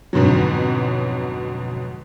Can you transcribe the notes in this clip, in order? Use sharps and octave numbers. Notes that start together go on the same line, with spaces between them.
F2 G#2 B2 D3 F#3